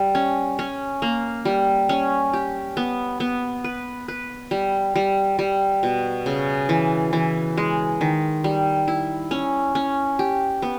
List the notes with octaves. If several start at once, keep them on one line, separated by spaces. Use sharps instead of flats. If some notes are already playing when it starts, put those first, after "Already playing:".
Already playing: G3
C#4
C#4
A#3
G3
C#4
G4
B3
B3
B4
B4
G3
G3
G3
B2
C#3
E3
E3
G#3
D#3
G3
E4
C#4
C#4
G4
B3